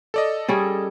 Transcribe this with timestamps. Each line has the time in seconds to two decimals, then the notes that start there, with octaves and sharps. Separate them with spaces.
0.14 A4 D5 D#5
0.48 G3 C#4 G#4